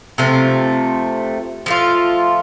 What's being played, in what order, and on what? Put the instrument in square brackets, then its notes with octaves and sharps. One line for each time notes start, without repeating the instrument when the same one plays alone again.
[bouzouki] C3 F3 A3 C4
F3 A3 F4